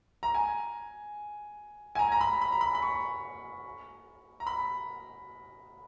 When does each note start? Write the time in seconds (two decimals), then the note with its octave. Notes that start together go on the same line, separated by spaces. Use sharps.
0.23 A#5
0.34 G#5
1.95 G#5
1.99 A#5
2.12 A#5
2.21 B5
2.41 B5
2.52 A#5
2.61 B5
2.75 B5
2.82 C#6
4.40 A#5
4.47 B5